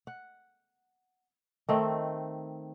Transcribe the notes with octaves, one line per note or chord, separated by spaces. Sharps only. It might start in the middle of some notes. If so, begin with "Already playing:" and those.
F#5
D#3 A3 C4